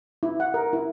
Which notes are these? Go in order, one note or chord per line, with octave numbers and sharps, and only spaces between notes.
E4
F#5
A#4
E4